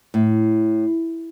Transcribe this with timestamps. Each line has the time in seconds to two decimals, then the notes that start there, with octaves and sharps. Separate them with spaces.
0.14 A2